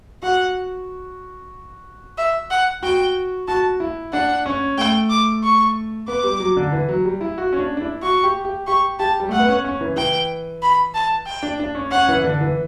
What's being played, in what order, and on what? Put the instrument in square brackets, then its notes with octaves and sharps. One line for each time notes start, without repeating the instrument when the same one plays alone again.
[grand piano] F#4 [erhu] F#5
[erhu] E5
F#5
[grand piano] F#4 [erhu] G5
[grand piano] F#4 [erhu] A5
[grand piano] E4
[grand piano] D4 [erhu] F#5
[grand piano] C#4
[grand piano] A3 [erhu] G5
[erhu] D6
C#6
[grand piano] B3 [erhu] D6
[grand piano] G3
F#3
D3
E3
F#3
G3
E4
F#4
C#4
D4
D4
E4
[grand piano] F#4 [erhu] C#6
[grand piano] G4
G4
[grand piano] G4 [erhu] C#6
[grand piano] G4 [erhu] A5
[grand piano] G3
[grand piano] A3 [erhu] F#5
[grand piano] B3
C#4
C#4
E3
[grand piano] E3 [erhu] G5
[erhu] B5
A5
G5
[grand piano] D4
D4
C#4
[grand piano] C#4 [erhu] F#5
[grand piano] E3
D3
E3